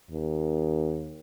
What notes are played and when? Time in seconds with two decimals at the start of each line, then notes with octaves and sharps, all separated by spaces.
0.11 D#2